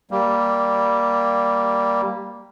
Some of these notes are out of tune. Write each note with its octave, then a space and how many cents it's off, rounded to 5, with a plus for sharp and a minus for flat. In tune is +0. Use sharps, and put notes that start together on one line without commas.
G3 +0 A#3 +0